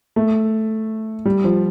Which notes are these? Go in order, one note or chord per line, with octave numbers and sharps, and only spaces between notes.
A3
G3
F3